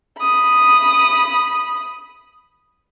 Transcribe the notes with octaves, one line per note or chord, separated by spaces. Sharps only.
B5 D#6